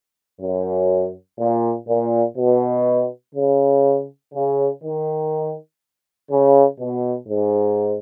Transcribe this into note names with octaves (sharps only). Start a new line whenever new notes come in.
F#2
A#2
A#2
B2
C#3
C#3
D#3
C#3
B2
G#2